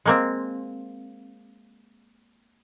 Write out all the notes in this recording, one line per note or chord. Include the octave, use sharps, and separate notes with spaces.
G#3 A#3 C4